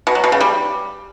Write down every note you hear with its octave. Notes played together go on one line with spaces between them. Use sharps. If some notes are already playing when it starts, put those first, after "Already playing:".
B2
F#3
B2
C#3
G3